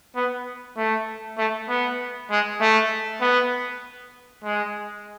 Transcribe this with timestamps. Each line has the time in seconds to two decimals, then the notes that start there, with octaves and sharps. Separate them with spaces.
0.16 B3
0.77 A3
1.38 A3
1.69 B3
2.30 G#3
2.61 A3
3.21 B3
4.44 G#3